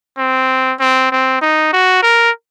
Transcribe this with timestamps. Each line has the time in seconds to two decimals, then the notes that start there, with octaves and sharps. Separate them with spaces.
0.18 C4
0.80 C4
1.11 C4
1.41 D#4
1.73 F#4
2.02 A#4